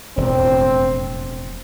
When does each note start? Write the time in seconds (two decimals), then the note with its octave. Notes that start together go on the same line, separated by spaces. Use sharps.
0.17 E1 F2 A2 C4